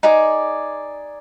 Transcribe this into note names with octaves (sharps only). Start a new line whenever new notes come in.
D#4 G#4 D5